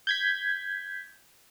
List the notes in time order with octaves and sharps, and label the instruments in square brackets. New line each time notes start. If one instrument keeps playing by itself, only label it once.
[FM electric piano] G6 G#6 B6